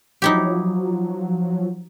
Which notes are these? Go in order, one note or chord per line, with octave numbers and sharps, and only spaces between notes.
F3 F#3 D#4 E4 G4